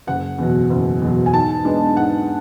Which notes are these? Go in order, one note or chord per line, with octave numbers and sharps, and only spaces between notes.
F#1 F#5
E2 B2 F#3
F#1
E2 B2 F#3
G#5
G#2 A5
G#3 B3 D4
G#2 F#5